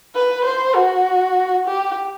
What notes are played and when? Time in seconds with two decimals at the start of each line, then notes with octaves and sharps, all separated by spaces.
0.15 B4
0.44 C5
0.75 F#4
1.66 G4